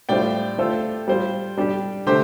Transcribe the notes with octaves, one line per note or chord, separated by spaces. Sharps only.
A2 G3 D4 F4 C5 D5 G5
A3 F4 A4 C5
G3 F4 C5
G3 D4 G4
D3 A3 G4 C5